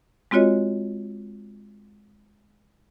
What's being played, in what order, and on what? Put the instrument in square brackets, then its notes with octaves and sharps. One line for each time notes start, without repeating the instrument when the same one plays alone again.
[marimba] G#3 C4 F4 F#4 C#5 D#5